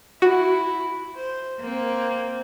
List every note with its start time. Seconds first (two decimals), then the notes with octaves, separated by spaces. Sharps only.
0.22 E4 F#4
1.15 C5
1.59 A#3 C4